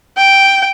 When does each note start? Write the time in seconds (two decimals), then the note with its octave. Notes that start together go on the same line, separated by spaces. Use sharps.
0.18 G5